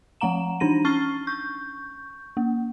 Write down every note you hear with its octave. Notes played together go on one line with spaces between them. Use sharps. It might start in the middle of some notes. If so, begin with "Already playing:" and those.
F3 A3 F#5 A#5 E7
E3 D4 D#4 A#6 D#7
C#4 C#6 F6 A6 C7 G7
C#6 G6
A#3